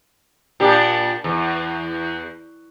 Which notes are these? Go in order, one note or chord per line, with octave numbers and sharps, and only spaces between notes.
A#2 D4 G4
E2